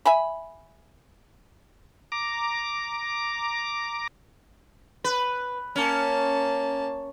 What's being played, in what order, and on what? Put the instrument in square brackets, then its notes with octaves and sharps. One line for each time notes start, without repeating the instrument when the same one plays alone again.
[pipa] E5 G#5 B5
[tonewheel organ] A#5 D6
[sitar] B4
[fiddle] A#3 A5 [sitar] C#4